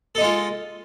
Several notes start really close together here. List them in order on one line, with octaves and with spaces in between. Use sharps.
A4 D#4 G#3 F4